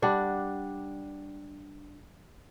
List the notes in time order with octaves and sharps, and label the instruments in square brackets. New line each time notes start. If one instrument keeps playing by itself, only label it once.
[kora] G3 D4 F#5